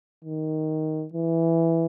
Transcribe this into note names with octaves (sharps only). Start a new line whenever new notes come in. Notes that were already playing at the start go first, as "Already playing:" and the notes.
D#3
E3